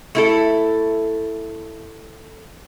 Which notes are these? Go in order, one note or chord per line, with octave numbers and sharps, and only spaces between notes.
A3 E4 A4